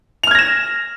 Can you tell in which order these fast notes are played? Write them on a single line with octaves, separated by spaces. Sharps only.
F7 F6 G#6 A#6 E7